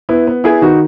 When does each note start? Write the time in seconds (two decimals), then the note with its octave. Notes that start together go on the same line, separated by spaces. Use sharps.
0.09 B3 E4
0.27 B3
0.44 B3 E4 G#4
0.62 D#3 D#4 F#4